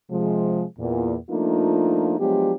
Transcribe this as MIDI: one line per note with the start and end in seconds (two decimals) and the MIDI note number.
0.10 0.64 48
0.10 0.64 53
0.10 0.64 56
0.79 1.15 40
0.79 1.15 46
1.30 2.16 53
1.30 2.16 57
1.30 2.16 58
1.30 2.16 62
1.30 2.16 63
1.30 2.16 65
2.19 2.53 53
2.19 2.53 54
2.19 2.53 56
2.19 2.53 59
2.19 2.53 62
2.19 2.53 67